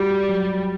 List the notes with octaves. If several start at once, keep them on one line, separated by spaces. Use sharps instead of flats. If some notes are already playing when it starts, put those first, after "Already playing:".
Already playing: G3 F#4
F#3